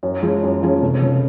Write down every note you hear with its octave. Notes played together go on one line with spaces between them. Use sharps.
F#2
F3 G#3 C#4
F#2
F3 G#3 C#4
F1
C#3